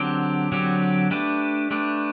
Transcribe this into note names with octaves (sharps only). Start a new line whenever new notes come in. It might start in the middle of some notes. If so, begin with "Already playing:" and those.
Already playing: D3 F#3 C4 G4
D3 F#3 C4 G4
A3 D4 G4 B4
A3 D4 G4 B4